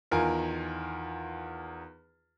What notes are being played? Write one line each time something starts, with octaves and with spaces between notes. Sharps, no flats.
E2 D#3 F4 A#4 G#5